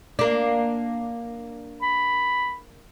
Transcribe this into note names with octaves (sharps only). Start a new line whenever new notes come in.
A#3 D4
B5